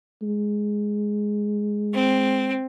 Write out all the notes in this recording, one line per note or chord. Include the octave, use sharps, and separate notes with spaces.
G#3
C4